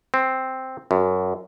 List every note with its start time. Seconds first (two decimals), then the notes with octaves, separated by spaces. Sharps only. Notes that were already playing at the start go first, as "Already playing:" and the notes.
0.14 C4
0.91 F#2